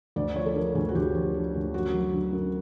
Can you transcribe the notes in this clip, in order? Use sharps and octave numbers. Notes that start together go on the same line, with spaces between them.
D2 D5
F3 C#5
A4
D3 A#4
D2 G#4
F#4
D2 G4
F3
D3
D2
F#2 F#4
F#3
D3
F#2